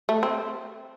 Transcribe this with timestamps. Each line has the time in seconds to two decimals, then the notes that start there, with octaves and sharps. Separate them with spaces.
0.09 A3
0.23 C4